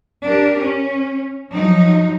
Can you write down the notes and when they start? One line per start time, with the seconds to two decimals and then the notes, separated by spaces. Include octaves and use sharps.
0.22 D4 G4 A#4
0.58 C#4
1.52 F3 F#3 D#4